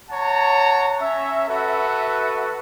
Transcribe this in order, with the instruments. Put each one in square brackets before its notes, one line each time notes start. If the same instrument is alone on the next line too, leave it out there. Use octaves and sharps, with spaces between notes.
[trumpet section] C#5 F#5 A5 A#5
C#4 E5
F#4 A4 B4 E5